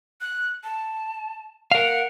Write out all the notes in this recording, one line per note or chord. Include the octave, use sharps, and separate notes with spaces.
F#6
A5
A#4 F5 F#5